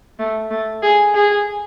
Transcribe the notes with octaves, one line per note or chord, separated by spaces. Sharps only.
A3
A3
G#4
G#4